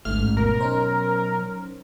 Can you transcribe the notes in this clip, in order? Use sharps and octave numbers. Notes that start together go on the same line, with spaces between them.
A1 D2 G#2 A3 F6
B2 F#3 A#4
C#4 D#4 C5